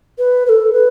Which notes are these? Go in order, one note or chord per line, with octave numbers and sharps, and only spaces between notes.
B4
B4
A4
B4